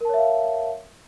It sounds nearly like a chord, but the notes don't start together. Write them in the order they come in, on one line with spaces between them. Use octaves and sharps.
A#4 A5 C#5 E5 F5